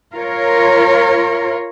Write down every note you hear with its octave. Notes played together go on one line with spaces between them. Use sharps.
F4 A#4 C#5